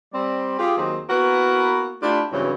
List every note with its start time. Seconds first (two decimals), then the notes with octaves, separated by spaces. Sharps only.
0.13 G3 C4 D5
0.59 F4 G4 G#4
0.77 D#2 D#3 F#3 C4 D#4 G#4
1.09 A#3 B3 E4 F#4 A#4 B4
2.02 A3 D4 E4 F4 G4
2.32 G2 C#3 E3 F#3 C4 C#4